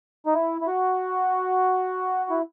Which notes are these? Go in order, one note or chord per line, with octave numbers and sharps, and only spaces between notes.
D#4
E4
E4
F#4
E4